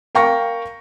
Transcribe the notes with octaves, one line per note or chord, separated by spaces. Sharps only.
A#4 F5 G5 C#6 A#6